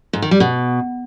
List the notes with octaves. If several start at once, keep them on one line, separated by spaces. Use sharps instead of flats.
G#2
D#3
G3
B2